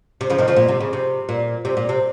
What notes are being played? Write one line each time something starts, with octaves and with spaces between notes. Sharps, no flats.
C3
C#3 F3
C3 D#3
C#3 F3
A#2
C3
C#3
C3
A#2
C3
A#2
C3